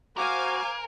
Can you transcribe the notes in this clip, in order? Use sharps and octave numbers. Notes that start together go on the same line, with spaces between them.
F#4 A#4 C5 F5 G#5 D6